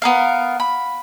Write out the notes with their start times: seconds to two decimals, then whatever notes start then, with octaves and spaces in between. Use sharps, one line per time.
0.02 B3 A#4 F5
0.60 B5